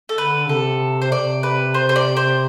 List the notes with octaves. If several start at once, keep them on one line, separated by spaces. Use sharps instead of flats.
A4
D3 B4
C3 A4
C5
C3 D5
B4
C5
C5
D5
C5